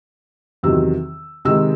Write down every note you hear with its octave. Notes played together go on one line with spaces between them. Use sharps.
E2 C3 D#3 F#3 E6
C3 D#3 G#3 E6